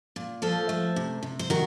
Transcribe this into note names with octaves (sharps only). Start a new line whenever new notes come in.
A#2
F3 A4 C5
A3
C3
C3
C5
D#3 F#4 A#4